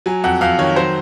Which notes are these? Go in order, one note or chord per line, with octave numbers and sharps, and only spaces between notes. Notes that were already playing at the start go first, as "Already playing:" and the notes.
F#3 G#5
F2 F#5
F2 F5
D#3 C#5
F#3 C5